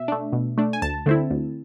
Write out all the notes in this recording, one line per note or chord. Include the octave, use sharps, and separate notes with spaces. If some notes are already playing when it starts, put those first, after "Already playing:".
Already playing: B2 E5
A3 D4
B2
A3 D4
G#5
D2 A5
D3 A3 C4 E4
D2